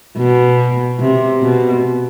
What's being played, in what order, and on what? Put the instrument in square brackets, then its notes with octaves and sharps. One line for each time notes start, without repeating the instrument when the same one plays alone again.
[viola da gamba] B2
C3
B2